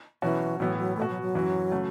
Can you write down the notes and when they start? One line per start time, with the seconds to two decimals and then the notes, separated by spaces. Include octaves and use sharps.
0.22 B2 E3 F#3 C#4 F#4
0.59 A2 E3 F#3 B3 E4
0.78 F#3
0.97 B2 A3 B3 F#4
1.10 F#3
1.22 F#3
1.35 F#2 E3 C#4 F#4
1.71 C#3 A3 F#4